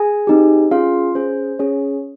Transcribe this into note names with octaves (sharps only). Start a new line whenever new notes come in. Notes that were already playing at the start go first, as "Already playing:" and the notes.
Already playing: G#4 G#5
C4 D#4 G4
C#4 F4 G#4 F5
C#4 G#4 C5
C#4 G#4 C#5